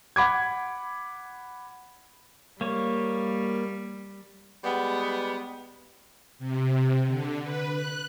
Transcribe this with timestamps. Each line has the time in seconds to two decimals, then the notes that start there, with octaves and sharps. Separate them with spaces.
0.16 F#5 B5 D6 G#6
2.61 G3 A#3 C#5
4.64 G3 G#3 B3
6.39 C3
7.07 D3
7.42 B4
7.72 F#6